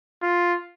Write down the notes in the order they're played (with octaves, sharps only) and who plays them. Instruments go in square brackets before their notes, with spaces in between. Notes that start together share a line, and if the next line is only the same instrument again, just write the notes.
[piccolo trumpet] F4